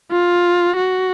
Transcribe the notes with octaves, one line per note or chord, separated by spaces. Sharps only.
F4
F#4